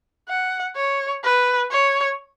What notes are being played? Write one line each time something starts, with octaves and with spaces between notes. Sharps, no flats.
F#5
C#5
B4
C#5